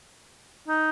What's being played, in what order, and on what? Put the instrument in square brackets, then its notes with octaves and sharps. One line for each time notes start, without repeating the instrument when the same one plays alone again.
[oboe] D#4